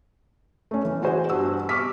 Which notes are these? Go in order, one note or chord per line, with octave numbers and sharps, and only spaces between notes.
A3 C#4
E3
F#4 G#4 C5 G#5
G2 F#4 E6
C#6 D6 E6 F6 B6